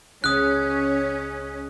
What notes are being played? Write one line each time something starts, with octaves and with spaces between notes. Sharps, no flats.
C#2 C#4 D#6 F#6